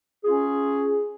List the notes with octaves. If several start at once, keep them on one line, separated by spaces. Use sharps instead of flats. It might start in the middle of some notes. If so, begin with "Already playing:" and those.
C#4 F4 G#4